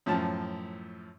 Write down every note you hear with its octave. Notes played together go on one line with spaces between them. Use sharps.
F#2 A2 F3 A5